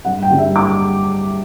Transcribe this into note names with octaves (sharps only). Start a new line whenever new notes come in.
G2 F#5
G5
D3 G3 D4
E5
D6